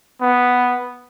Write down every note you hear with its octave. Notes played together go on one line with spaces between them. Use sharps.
B3